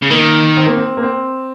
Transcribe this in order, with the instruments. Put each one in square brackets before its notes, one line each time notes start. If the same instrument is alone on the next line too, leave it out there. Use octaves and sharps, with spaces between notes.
[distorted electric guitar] C#3
[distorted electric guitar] D#3 [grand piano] A#3
[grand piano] C4
A#3
C4
A#3
C4